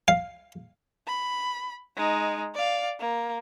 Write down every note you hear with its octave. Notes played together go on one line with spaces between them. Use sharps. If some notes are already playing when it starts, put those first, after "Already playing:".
F5
B5
G#3 D#4
D5 F5
A#3